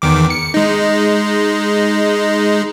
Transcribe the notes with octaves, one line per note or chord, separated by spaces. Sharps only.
E2 D#3 D6
C#7
G#3 D#4